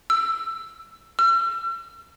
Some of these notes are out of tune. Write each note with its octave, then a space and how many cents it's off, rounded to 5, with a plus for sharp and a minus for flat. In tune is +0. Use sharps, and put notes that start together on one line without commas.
E6 +15
E6 +45